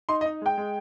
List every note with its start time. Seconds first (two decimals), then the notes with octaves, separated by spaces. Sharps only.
0.09 D#4 C6
0.21 D#5
0.26 D#4
0.42 G#3 G5
0.58 G#3